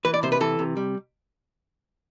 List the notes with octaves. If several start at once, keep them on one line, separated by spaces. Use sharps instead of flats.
E3 B4
D5
C3 C5
B4
E3 A4
C3
G3